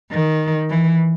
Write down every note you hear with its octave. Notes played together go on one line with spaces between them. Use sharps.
D#3
E3